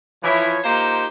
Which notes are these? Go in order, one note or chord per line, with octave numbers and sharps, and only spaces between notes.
E3 F3 E4 C#5
A#3 D#4 F4 G4 C5